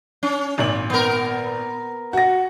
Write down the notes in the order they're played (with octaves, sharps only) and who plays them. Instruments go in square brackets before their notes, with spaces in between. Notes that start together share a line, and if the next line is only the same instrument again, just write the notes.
[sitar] C#4
[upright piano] G#1 A#2 F#7
[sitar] B3 A#4
[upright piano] F#4 A#6 [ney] F#5